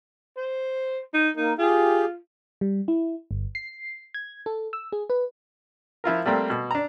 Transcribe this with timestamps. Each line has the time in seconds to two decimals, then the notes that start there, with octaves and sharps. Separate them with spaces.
0.37 C5
1.14 D#4
1.37 A#3 D#4 A#4
1.59 F4 G4 G#4
2.61 G3
2.88 E4
3.31 G1
3.55 C7
4.14 G#6
4.46 A4
4.73 E6
4.92 G#4
5.10 B4
6.04 F3 E4 F4 A#4
6.26 G3 A3 A#3 C4
6.50 B2
6.71 D4 A#5